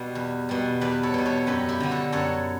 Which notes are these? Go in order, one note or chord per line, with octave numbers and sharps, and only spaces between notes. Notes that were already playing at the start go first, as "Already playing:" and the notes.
Already playing: B2 G3
E2
B2 G3
E2 B4 D5
A4 C#5
B2 G3
A4 C#5
F#2 G4 B4
E4 G4
D3 G3
F#4 A4
F#2 A4 C#5